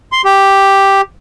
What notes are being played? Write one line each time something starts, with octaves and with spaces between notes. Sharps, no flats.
C6
G4